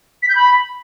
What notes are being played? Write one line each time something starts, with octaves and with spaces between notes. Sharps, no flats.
B6
G6
B5